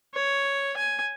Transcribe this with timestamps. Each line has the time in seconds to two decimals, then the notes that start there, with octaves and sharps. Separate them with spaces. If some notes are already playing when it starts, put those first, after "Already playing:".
0.14 C#5
0.76 G#5